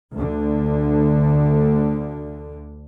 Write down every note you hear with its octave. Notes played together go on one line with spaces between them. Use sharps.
D2 D3